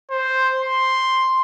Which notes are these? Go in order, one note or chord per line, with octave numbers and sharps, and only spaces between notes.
C5
C6